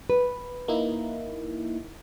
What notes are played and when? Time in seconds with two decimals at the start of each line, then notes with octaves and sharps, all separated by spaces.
0.10 B4
0.68 A#3 D#4 E4